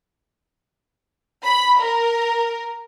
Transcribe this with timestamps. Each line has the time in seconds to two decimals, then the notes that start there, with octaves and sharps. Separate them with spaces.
1.44 B5
1.79 A#4